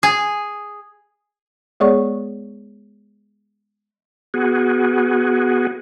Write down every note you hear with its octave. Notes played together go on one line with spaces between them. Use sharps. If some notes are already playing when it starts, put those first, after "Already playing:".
G#4
G#3 B3 G#4 C#5 D5 C#6
B3 F#4 G#4